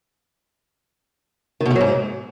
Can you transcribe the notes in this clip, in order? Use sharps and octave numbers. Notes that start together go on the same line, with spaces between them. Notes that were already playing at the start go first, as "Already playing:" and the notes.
D#3
B2
A3
F#3
G#2